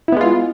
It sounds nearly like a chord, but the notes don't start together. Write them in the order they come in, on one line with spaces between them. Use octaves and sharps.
E4 B3 G#3 F4